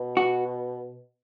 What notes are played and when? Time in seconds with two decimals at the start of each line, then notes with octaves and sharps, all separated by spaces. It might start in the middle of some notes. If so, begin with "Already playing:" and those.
Already playing: B2
0.17 F#4